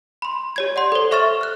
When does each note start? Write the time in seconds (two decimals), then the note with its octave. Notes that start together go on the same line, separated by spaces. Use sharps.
0.22 B5 C6
0.56 G4 C#5 G#6
0.76 D5 F#5 C6
0.92 A4 C5
1.11 A4 E5 C#6 F6 A6 E7
1.41 F6 F#6